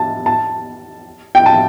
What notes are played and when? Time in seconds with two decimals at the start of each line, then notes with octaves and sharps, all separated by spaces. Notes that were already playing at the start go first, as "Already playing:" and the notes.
Already playing: A5
0.26 A5
1.35 G5
1.46 A5